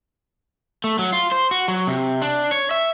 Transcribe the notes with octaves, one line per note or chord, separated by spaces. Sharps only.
A3
F#3
F4
C5
F#4
F#3
C3
D4
C#5
E5